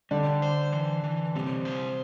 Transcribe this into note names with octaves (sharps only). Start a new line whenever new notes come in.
D3 G3 D4
C5
E3
E3
C3 G3 C4
C5